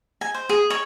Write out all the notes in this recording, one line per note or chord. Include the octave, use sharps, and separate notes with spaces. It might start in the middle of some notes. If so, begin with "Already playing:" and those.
G#5
C5
G#4
C#5